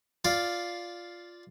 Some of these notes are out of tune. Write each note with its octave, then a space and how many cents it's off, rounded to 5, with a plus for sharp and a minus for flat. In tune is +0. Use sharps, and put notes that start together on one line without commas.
F4 +0 D5 +0 F5 +0